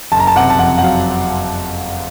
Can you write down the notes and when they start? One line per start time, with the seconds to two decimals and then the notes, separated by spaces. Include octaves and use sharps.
0.12 F#1 A5
0.20 A#5
0.27 A5
0.36 C3 F#5
0.50 A5
0.59 F2 F#5
0.78 F#5
0.83 F#3 F5